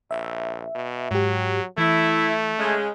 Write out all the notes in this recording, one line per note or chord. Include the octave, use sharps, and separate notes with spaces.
A#1 E5
B2
G#2 F#3 G4
E3 A3 E4
C#3 G#3